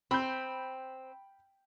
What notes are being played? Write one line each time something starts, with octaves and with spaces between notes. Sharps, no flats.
C4 B5 G6